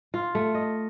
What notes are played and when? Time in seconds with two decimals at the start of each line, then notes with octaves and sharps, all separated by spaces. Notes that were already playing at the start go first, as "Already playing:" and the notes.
0.14 F4
0.35 A3
0.55 D#5